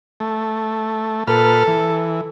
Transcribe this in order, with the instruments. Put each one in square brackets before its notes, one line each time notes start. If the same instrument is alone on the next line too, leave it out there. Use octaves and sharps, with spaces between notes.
[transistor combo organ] A3
[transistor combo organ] A#2 B4 F6 [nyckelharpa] A4
[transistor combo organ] E3